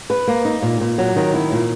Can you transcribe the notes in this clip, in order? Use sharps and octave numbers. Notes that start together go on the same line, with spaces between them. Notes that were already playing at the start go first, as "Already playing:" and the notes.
B4
A#3
D#4
A#2
A#2
F#3
D#3
E4
A#2